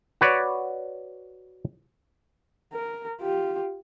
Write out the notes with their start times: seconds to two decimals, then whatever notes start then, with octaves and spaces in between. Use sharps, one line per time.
0.21 F#4 B4 C#5 D5
2.73 A#4
3.21 F4 G4